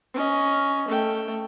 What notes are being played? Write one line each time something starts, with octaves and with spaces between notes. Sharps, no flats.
C#4 D#5
A3 G5